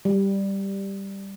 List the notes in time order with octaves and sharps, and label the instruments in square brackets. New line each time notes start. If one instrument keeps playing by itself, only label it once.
[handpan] G3